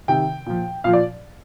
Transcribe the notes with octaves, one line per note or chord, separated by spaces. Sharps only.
C3 D#3 G5
A#2 F3
A#2 F3 F5
D5